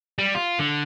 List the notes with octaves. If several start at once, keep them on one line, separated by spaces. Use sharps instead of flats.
G3
F4
D3